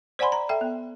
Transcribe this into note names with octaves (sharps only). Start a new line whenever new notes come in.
C5 D5 F#5 G#5 B5 C6
A#5
A4 E5 G5
B3